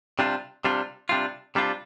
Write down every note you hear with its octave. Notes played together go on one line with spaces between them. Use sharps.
C3 G3 D4 F4
C3 G3 D4 F4
C3 G3 D4 F4
C3 G3 D4 F4